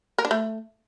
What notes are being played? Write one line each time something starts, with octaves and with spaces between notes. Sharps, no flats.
A#4
D4
A3